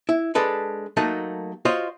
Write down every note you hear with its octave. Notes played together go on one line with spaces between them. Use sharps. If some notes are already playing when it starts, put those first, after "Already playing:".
E4
G#3 D4 A4 B4
F#3 A3 A#3 D#4 A4
F4 F#4 C5 C#5 D#5